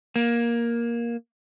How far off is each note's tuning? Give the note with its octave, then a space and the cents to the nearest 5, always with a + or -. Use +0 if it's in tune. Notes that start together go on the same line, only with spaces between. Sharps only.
A#3 +10